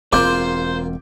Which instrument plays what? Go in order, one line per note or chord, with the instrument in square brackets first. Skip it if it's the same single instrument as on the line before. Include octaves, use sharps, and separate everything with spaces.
[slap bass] E1 C4 [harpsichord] A#3 F4 [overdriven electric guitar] C5 [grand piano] D6 G6